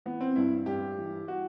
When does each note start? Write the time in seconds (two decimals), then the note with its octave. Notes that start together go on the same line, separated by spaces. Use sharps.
0.06 E3 B3
0.21 C4
0.36 G2 E4
0.66 G2 G4
0.98 E3
1.28 F#4